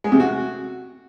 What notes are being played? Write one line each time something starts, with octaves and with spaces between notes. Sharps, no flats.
G#3
C3
F#4